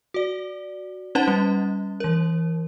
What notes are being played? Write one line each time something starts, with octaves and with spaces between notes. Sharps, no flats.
F#4 D5
C#4 D#4 B4 C5 F#5 A5
G3 C#4
E3 A#4